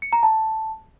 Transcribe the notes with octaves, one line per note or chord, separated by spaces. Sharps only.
C#7
A#5
A5